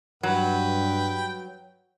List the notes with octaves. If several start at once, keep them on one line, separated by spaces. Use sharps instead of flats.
G2 F#3 B4 G5